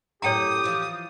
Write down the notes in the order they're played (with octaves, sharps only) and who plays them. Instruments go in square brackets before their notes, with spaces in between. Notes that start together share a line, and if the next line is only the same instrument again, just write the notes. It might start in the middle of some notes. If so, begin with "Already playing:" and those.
[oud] F#2 A2 C#3 [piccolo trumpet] G4 [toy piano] C#5 G5 A#5 [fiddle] D#6
[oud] E3 F3